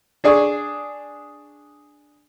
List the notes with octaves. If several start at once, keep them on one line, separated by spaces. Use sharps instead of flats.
D4 G#4 D5 C#6